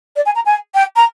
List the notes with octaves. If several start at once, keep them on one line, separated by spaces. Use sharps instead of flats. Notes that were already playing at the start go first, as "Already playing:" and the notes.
D5
G#5
A#5
G#5
G5
A#5